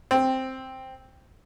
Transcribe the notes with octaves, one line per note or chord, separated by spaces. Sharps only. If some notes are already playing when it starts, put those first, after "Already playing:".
C4